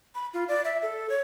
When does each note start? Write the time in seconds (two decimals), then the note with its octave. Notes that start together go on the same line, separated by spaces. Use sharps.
0.15 B5
0.34 F4
0.48 D5
0.65 E5
0.82 A4
1.10 C#5